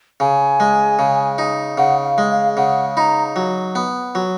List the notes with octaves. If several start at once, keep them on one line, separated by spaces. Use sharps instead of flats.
C#3 G#5
G#3
C#3
D#4
C#3 F#5
F5
G#3
F5
C#3 F#5
D#4 A#5 B5
F#3
B3
F#3